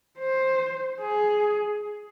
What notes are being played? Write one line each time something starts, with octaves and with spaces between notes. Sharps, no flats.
C5
G#4